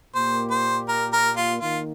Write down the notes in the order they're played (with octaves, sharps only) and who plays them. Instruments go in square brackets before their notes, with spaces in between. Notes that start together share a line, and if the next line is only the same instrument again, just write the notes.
[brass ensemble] A#2 A#3 G4 [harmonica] C5
[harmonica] C5
A#4
A#4
F4
[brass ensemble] D#3 A#3 [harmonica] F4